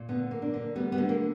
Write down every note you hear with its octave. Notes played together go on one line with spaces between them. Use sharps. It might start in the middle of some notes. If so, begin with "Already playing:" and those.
Already playing: A#2
D3 B3
A#3
D4
D3
G3 B3
B3
D3
A#3